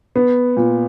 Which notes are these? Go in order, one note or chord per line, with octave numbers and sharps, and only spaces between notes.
B3
A#2